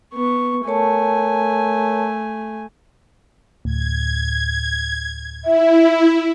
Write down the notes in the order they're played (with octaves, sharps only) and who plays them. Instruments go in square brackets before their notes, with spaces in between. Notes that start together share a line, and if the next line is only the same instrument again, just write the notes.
[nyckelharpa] B3 C#6
[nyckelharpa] A3 G#5 [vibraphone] A#4 C#5 A5
[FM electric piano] D2 A2 [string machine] G#6
[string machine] E4 [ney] E5